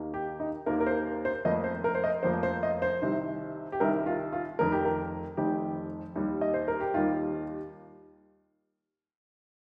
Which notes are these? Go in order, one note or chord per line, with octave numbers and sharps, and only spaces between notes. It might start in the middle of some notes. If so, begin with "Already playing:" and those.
Already playing: D#2 D#3 A#3
G4
D#4
D#2 D#3 A#3 A#4
A#4
C5
C5
F1 F2 F3 A#3 D#5
C5
A#4
C5
D#5
F1 F2 F3 A#3 C5
C5
D#5
C5
C2 C3 D#3
G4
C2 C3 D#3 A#4
F4
F4
F1 F2 D#3 A#4
G4
A#4
F1 F2 D#3 G4
D#2 D#3 G3
D#5
C5
A#4
G4
D#2 D#3 G3 F4